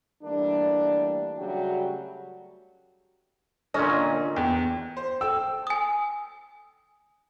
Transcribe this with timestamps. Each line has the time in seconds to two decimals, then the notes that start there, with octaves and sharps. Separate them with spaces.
0.23 E3 G3 A3 A#3 D4
1.37 C#3 F#3 G3 A3 F#4 G4
3.74 A#2 D3 C#4 D#5
4.36 E2 G5
4.97 C5
5.21 A4 G5 E6
5.67 G#5 D#6